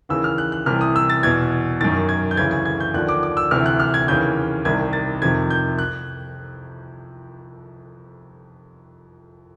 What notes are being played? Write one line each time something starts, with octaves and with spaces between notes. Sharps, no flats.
D#2 C#3 E3 E6
F6
F#6
F#6
C2 C3 E3 F6
D#6
E6
A6
E2 B2 G#6
F#2 D#3 A6
G#6
G6
D2 C#3 E3 G#6
G#6
G#6
G6
D#2 D3 F3 F#6
D6
D6
E6
D2 C3 E3 F6
F#6
F6
G#6
D#2 C#3 E3 G6
C2 C3 D#3 G#6
A6
F2 C3 D#3 G#6
G6
F#6